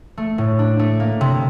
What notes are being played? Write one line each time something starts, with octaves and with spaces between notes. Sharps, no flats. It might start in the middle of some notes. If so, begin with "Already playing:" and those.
A3
A2
D4
A3
A#3
C3